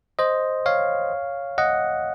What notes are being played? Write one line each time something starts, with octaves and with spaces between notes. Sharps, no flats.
C5 D#5
C#5 F5
D#5 F#5